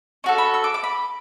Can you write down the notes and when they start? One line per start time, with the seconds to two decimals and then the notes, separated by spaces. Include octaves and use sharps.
0.24 C#4 F#4 A4
0.38 B5
0.54 E6
0.64 D6
0.74 D6
0.84 B5